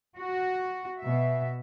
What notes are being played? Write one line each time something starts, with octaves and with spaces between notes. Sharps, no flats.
F#4
B2 E5